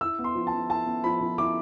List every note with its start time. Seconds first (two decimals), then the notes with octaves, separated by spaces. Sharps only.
0.01 E4 E6
0.19 B3
0.24 C6
0.35 F3
0.47 A5
0.52 F3
0.70 E4 A5
0.86 B3
1.04 F3 B5
1.21 F3
1.38 E4 D6